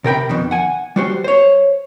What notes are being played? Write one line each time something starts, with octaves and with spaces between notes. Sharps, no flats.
C3 A#4 G5 B5
F2 B2 D#3
F#5 G#5
G3 F#4 C5
C5 C#5